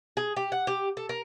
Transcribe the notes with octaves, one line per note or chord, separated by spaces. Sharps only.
G#4
G4
F#5
G4
A4
A#4